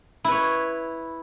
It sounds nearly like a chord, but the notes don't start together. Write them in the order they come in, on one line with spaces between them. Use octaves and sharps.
E4 B4 C#5